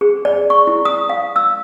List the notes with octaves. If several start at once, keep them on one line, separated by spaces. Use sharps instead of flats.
G#4
D5
C#6
E4
D#6
F5
E6